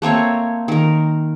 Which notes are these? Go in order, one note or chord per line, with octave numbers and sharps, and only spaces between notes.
A3 A#3 C4 C#5
D#3 A#4